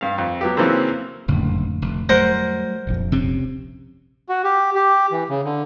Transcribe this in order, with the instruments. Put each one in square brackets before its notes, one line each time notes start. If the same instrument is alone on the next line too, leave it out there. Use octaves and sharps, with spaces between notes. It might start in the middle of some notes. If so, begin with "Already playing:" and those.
[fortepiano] G2 F5
F2
F#3 B3 G4
C#3 E3 F#3 A#3 C4
[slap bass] F#1 [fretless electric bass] F2 A2 D3
[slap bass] F1
[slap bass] F#3 G3 A3 [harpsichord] A#4 C5 F#5
[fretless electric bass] D#1 A#1 F2
[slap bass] C3 C4 C#4
[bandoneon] F#4
G4
G4
E3
C#3
D3